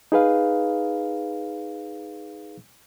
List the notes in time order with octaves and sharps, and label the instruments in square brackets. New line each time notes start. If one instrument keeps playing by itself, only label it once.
[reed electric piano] D#4 G#4 B4 F5